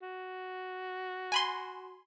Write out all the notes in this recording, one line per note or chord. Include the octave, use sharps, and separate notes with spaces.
F#4
G#5 B5 C6